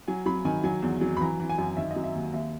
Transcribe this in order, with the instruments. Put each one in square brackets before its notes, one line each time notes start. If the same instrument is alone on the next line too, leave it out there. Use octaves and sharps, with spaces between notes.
[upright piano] F#3 G#5
F#3 B5
D#3 G#5
F#3 G#5
E2
F#3
B5
E3 A#5
E3
G#5
F#2
D#3 E5
D#5
F#3
E5
D#2
D#2 E5